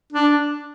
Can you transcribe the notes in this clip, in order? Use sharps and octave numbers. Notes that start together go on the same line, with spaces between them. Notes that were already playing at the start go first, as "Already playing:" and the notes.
D4